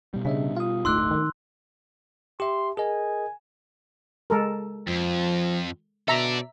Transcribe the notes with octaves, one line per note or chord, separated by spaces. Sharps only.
B2 G3
C#3 D4 D#5 E5
F4 F5 D#6
D1 G1 A3 D#4 C6 D6 E6 F#6
D#3
G4 E5 C6
G#4 A#4 D#5 G#5
G#3 A4 A#4
F2 F3
B2 A4 D5 E5 A#5